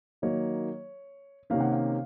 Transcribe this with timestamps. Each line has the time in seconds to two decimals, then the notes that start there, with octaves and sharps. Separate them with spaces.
0.22 D#3 F#3 A#3 D#4 C#5
1.50 C3 D#3 A#3 C#4 F5
1.60 F#5
1.72 F5